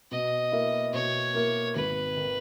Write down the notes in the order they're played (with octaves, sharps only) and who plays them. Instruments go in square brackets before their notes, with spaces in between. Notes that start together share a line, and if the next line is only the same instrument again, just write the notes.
[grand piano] B2 [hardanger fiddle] D#5
[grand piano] A#3 E4 A#4
[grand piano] B2 [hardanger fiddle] C#5
[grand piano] A#3 E4 A#4
[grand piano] G#1 [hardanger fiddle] B4
[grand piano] D#3